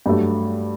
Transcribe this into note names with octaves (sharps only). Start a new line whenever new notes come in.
G2 F#3 A3